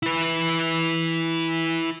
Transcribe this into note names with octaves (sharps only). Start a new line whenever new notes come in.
E4 B4